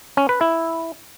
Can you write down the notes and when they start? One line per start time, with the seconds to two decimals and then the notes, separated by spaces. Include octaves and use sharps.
0.17 C#4
0.29 B4
0.41 E4